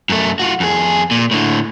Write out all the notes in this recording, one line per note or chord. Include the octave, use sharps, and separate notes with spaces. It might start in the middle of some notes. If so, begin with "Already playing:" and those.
F#2 A3
F4 F#4
F2 G#4
A#2
A2 D3